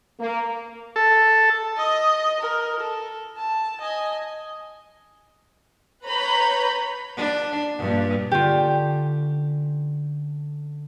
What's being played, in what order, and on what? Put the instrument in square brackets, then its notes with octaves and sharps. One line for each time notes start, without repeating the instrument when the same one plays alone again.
[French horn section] A#3
[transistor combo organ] A4
[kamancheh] D#5 D#6
A#4
A4
A5
D#5 G#5
[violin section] B4 C#5 A#5 B5 G6
[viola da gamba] D4
G2 A#2
[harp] D3 C#4 [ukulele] F4 G4